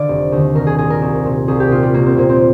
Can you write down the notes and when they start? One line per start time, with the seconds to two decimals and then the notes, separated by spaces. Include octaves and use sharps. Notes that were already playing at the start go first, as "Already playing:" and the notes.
Already playing: D3 D5 F5
0.09 F1
0.32 D#2 D3
0.55 C2 A#4
0.67 G#4
0.78 A#2 G#4
0.90 A#4
1.02 C2
1.25 A#2
1.48 C2 G#4
1.60 G4
1.71 A#2 F4
1.83 G3
1.94 C2 A#3
2.06 C4
2.17 A#2 A#3
2.29 C4